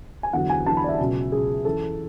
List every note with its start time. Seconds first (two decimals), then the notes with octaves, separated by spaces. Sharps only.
0.23 G#5
0.33 E2 D3 F#3 F#5
0.50 G#5
0.66 E2 D3 F#3 A5
0.77 B5
0.84 D5
0.89 E5
0.99 C#2 B2 F#3
1.32 C#2 B2 F#3 G#4
1.65 F#2 E3 A4